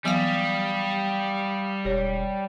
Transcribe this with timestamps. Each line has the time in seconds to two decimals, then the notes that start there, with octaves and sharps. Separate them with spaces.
0.05 E3 F#3 G3 B3 F5 D#6
1.85 E1 G4 C#5